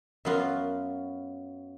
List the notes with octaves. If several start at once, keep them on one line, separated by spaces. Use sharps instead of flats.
F#2 F#3 B3 F4